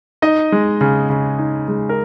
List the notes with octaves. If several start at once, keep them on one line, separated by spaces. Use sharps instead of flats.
D#4 D#5
G#3
C#3
C#3
D#4
G#3
A#4